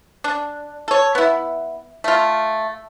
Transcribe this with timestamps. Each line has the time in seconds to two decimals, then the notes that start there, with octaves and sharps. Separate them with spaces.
0.24 D4
0.88 A4 C#5
1.15 B3 E4
2.04 A3 F4